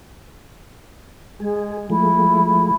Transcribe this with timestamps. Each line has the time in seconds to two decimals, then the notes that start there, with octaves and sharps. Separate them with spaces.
1.40 G#3 G#4
1.90 F3 G#3 A3 E4